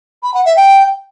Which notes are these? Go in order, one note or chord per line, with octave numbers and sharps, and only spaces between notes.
B5
F#5
E5
G5